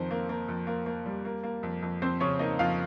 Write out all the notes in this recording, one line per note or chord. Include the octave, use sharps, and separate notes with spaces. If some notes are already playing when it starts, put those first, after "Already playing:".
Already playing: F2 D#3 C4 C5
A#3
A#3
F2
A#3
A#3
G3
A#3
A#3
F2
F2
F2 C4 C5
C#3 C#4 C#5
A#3 D#4 D#5
F2 F4 F5